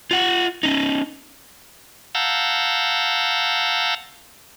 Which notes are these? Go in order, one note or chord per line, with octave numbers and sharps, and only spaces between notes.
F4 F#5
C#4 D#4
F5 F#5 A5 A#5 E6 G6